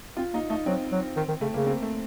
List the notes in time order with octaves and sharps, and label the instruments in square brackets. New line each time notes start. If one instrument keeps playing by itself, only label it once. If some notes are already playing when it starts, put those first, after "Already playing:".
[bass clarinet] C4 [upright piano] F4
[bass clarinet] A#3 [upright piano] D#4
[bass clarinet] A3 [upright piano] D#4
[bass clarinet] F#3 [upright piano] C4
[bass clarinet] F#3
D#3
D#3
[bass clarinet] C#3 [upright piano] A3
[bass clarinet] C#3 [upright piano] A#3
[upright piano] C4
A3